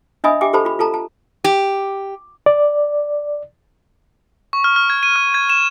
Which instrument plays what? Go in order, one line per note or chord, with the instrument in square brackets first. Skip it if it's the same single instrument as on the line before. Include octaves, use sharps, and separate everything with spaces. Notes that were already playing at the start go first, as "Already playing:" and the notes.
[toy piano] D4 D#5 E5 G#5 B5 D#6
G4 E5 G5 G#5 D6
G4 A4 C5 A5 B5
F4 B5
F4 A4 A5 A#5
A5
[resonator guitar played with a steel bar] G4
[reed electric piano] D5
[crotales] C#6
F6
F6
G#6
D#7
F6
G#6
E7